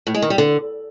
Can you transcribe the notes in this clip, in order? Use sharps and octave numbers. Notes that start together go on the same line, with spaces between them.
A2
G#3
D#3
G3
D3